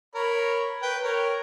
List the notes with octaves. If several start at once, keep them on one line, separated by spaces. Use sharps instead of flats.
A#4 C#5 B5
B4 G5
A#4 C#5